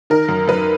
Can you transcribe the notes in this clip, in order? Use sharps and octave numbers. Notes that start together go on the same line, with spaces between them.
D#3 A#4
F#2
F#2 B4